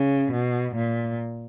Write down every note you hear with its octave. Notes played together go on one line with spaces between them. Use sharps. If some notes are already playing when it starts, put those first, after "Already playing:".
Already playing: C#3
B2
A#2